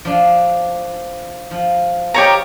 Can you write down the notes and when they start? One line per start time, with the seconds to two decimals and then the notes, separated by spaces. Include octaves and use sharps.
0.05 F3 D4
1.51 F3
2.14 G4 A#4 C#5 D#5 A5 A#5